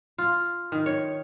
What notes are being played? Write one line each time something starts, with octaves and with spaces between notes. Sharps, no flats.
F4
D#3
C#5